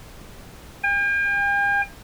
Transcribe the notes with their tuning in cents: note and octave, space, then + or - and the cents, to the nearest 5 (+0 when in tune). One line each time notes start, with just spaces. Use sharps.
G5 +45